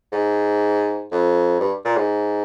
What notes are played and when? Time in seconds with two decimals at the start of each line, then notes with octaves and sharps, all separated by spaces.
0.12 G#2
1.12 F2
1.60 G2
1.85 A#2
1.97 G#2